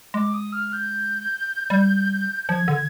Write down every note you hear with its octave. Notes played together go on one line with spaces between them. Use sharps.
G#3 D6
D#6
F6
G6
G3
F3 G#6
D3